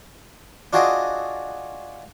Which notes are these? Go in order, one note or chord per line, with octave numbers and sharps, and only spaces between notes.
D4 F4 F#4 G#4 D5 D#5